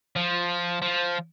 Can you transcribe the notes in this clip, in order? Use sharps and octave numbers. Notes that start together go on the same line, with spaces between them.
F3
F3